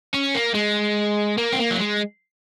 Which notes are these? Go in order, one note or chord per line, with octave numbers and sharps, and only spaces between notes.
C#4
A#3
G#3
A#3
C4
A#3
F#3
G#3